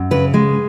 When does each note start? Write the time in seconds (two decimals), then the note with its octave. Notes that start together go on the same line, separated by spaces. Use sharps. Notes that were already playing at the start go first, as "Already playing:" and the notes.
Already playing: F#2
0.11 C#3 B4
0.34 G#3